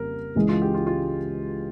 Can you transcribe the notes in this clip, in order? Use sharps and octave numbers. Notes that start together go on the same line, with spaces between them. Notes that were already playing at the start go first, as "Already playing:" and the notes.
Already playing: F2 C#3 G3 A#3 C#4 A#4
C#2 C#3 E3 G#3
F4
G4
F4
F4